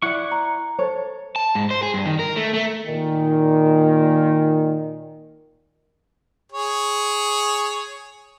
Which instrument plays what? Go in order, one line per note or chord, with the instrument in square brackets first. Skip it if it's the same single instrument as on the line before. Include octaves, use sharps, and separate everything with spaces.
[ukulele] E4 D5 [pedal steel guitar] F#5 C#6
[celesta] A#5
[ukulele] A4 C#5 [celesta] C5
[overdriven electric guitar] A5
G#2
C5
G#4
G2
D#3
A#4
A3
A3
[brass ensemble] A#2 D#3
[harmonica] G#4 C#5